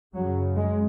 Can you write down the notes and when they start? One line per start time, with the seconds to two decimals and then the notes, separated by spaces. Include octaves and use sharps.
0.14 F#2 C#3 F#3
0.55 G#3